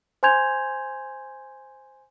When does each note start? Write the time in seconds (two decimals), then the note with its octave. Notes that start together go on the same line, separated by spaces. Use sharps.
0.23 C5 G#5 C6 G6 G#6 F7